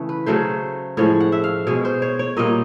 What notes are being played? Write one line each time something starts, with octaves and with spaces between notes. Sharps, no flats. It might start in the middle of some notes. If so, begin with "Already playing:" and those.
Already playing: C#3 E3 A3
B4
C#3 F#3 A3 C5
A2 F3 G#3 C#5
F#5
E5
F5
B2 G#3 C#5
C5
C#5
C#5
A#2 G3 A#3 D#5